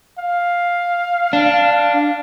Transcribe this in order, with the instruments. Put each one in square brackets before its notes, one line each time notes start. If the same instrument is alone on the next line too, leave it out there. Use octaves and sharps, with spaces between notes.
[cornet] F5
[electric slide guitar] D4